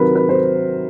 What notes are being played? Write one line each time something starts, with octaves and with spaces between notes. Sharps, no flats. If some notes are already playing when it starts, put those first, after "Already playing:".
Already playing: C3 D#3 F#3 A#4 B4
B4
C5